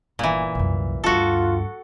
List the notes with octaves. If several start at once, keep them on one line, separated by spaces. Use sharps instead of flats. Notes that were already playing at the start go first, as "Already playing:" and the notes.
G1 A#2 E3
C2 F#2
D2 G2 F4 F#4 A4